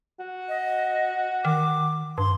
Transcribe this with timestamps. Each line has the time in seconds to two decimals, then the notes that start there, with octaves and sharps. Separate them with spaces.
0.19 F#4
0.49 D#5
1.45 D#3 D6
2.18 G2 C6